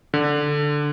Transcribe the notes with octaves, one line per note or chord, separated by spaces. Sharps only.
D3